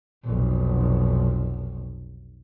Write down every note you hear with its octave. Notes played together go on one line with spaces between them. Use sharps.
F1 B1